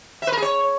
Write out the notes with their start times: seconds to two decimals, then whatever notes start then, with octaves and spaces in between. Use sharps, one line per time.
0.22 E5
0.27 B4
0.32 A#4
0.37 G#4
0.42 C#5